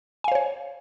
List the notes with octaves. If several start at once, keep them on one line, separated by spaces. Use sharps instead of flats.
C5 C#5 F5 G#5